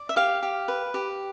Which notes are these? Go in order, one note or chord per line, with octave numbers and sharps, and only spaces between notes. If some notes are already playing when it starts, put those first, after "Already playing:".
Already playing: D5
E5
G4 F5
G4
B4
G4